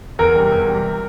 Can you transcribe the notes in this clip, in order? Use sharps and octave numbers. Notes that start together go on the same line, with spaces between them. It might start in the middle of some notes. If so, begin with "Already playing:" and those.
E2 A#4
C3 G3
E2
C3 G3